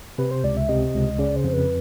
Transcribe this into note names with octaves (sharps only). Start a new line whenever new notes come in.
C3 B4
C5
C#2 D5
E5
C3 D#5
C#2
C#3 D5
C5
F2
B4